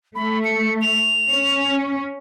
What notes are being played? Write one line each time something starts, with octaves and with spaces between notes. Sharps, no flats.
A3 B5
C#7
F7
C#4